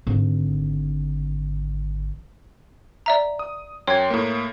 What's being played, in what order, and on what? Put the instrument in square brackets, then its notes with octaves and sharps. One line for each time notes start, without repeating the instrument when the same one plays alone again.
[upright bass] G#1 D3
[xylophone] D5 E5 A#5
[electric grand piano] D#6
[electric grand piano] F#2 G5 C6 [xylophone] C#5 G#6
[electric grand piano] A2 A#3